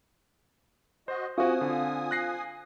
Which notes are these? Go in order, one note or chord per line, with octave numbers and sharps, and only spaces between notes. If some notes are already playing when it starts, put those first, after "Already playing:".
F#4 C5 D#5
C4 F4 F#4 G#5 C#6 D#6
D3
F#6 A#6 C7